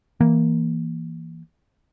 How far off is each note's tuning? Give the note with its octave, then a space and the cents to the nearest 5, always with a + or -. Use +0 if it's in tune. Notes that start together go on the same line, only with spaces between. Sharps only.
E3 +0 A#3 +0